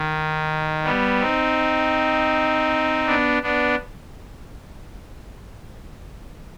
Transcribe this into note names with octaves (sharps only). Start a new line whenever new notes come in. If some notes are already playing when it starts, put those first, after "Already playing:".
Already playing: D#3
G3 B3
C4 D#4
B3 D4
B3 D4